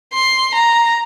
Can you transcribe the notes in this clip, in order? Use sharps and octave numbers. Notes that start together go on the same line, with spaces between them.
C6
A#5